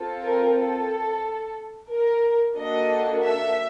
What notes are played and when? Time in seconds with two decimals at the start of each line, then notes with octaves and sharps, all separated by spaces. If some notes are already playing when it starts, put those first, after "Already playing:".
Already playing: C4 F4 A4
0.23 A#4
0.56 A4
1.90 A#4
2.56 A#3 D4 F#4 A4 D#5
3.23 E5